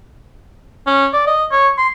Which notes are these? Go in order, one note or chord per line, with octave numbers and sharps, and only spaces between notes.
C#4
D5
D#5
C#5
C6